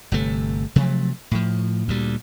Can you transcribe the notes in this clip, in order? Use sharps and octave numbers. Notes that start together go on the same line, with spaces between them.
G1 C3 A3
C3 F3 F#3 A3
A2 F3
D2 A#2 G3